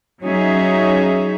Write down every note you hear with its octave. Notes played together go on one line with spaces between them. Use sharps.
F#3 C#4 D#4 G#4 E5